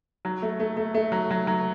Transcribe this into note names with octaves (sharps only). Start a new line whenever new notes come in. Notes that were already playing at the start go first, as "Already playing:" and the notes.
F#3
A3
A3
A3
A3
F#3
F#3
F#3